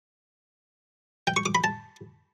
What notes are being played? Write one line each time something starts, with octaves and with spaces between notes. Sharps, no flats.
G5
C#6
D6
B5
A5